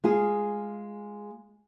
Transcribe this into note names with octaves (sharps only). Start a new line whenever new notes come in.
G#3 F4 G#4